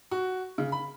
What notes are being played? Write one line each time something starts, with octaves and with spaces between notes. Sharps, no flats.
F#4
C#3
B5